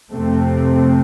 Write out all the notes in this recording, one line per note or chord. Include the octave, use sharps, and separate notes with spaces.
F2 C3 A3 C4